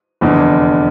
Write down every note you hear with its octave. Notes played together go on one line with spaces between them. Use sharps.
F1 E2 D3